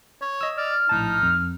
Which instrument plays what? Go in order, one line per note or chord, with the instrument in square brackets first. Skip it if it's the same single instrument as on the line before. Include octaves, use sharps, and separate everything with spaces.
[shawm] C#5
[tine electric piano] D#5 E6
[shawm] D5 [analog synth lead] F6
[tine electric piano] A#1 A2 A5 [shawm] D#4
[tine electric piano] F2